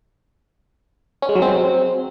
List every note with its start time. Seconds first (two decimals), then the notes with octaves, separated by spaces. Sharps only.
1.22 C#4
1.29 G#3
1.35 F#3
1.42 C4